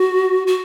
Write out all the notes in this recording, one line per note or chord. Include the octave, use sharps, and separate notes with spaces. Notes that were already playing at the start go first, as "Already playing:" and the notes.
Already playing: F#4
F#4